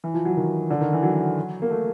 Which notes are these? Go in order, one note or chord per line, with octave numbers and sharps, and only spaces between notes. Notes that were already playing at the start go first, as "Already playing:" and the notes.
E3
F3
F#3
D#3
D3
D#3
E3
F#3
A#3
A3